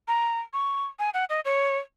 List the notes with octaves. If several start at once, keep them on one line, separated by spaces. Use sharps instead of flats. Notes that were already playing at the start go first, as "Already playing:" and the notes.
A#5
C#6
G#5
F#5
D#5
C#5